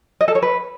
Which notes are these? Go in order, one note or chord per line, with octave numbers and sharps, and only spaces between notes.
D#5
A4
C#5
B4